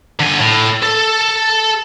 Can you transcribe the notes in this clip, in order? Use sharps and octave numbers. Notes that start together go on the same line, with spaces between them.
D3 G#5
A2
A4